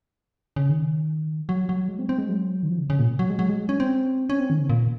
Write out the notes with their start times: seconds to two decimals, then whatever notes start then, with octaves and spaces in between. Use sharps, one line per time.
0.56 C#3
0.69 D#3
1.49 F#3
1.69 F#3
1.89 G#3
1.99 C4
2.09 C4
2.18 G#3
2.29 F#3
2.63 D#3
2.69 F3
2.79 C#3
2.90 C#3
2.99 A#2
3.19 F#3
3.30 G#3
3.39 F#3
3.49 G#3
3.69 C#4
3.80 C4
4.30 C#4
4.40 C4
4.50 D#3
4.60 C#3
4.69 A#2